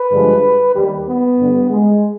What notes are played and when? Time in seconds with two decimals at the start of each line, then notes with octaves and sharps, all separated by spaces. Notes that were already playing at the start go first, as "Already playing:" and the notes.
Already playing: B4
0.11 G2 D3 F3 G#3
0.76 D#2 D#3 G3
1.08 B3
1.39 G2 D3 G3
1.71 G#3